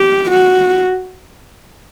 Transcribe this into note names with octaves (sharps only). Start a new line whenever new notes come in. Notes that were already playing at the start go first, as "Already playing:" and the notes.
Already playing: G4
F#4